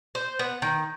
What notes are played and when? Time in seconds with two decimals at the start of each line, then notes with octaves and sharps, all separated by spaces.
0.15 C5
0.39 B3
0.62 D#3